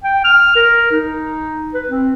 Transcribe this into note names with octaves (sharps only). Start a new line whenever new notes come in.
G5
F6
A#4
D#4
B4
C4